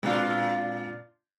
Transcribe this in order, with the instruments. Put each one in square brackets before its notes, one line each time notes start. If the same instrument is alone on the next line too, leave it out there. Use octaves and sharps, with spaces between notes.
[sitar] A#2 D4 F4 [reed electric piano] G#3 C4